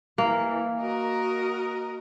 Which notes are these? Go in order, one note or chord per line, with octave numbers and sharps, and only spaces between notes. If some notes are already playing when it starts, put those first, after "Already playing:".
E3 A#3
F#4 A#4 D#5